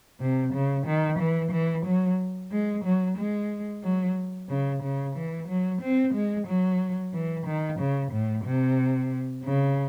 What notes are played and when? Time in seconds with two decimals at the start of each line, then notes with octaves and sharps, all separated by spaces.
0.20 C3
0.53 C#3
0.87 D#3
1.19 E3
1.52 E3
1.86 F#3
2.52 G#3
2.85 F#3
3.18 G#3
3.83 F#3
4.49 C#3
4.83 C#3
5.16 E3
5.48 F#3
5.82 C4
6.14 G#3
6.47 F#3
7.14 E3
7.46 D#3
7.79 C#3
8.12 A2
8.45 C3
9.44 C#3